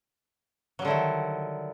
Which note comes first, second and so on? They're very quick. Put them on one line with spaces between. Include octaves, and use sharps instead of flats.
F#3 G3 D3 E4 D#3